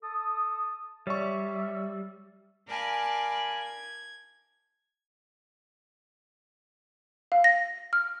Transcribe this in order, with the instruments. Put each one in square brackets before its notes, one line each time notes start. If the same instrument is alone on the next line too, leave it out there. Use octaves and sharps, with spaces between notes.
[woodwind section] A4 A5 D#6
[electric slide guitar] G3 [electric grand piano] C#5 D5 C#6 [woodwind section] E5
[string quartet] A#4 D5 F5 G#5 A5 B5
G#6
[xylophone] F5
A#6
F6